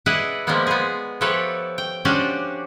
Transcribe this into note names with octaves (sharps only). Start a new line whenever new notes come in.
E4 G#4 B4 D5 D#5 F#5
F3 G3 G#3 A#3 B3
B3 G#4
F3 E4 G4 A4 B4 C#5
G5
F3 C#4 D4 F#4 G4 D5